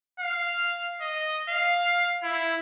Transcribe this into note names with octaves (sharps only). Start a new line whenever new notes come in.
F5
D#5
F5
E4